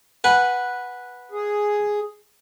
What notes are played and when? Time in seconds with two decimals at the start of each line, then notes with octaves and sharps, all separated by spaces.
0.24 B4 F#5 G#5
1.32 G#4